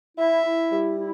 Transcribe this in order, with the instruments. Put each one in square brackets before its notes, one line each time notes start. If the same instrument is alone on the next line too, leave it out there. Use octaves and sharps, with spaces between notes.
[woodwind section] E4 [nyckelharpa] E5
[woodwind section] E4
G3
E4